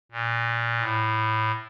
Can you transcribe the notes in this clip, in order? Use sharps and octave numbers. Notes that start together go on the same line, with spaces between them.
A#2
A2